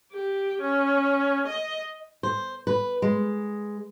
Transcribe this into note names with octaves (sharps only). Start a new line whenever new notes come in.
G4
C#4
D#5
C5
B4
G#3